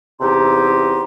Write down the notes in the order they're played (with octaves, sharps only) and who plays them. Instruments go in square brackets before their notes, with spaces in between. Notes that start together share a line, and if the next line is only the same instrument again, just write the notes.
[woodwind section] E2 C3 D#4 G4 C6